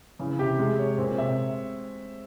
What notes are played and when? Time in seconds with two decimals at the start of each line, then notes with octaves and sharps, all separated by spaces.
0.19 C#3 E3
0.39 C3 G4
0.59 C3 G#3
0.79 C#5
0.98 A#2 C4
1.18 C3 E5